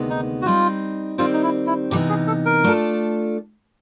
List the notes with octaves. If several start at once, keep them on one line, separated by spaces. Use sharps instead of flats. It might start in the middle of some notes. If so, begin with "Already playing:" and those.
Already playing: D2 C3 D#3 G#3 B3
D#4
F#4
G3 C4 D#4 F4
D#2 D#3 G3 C4 F4
D#4
E4
E4
C3 E3 G3 B3 D#4 G4
G#4
A4
A#4
A3 D4 F4 A4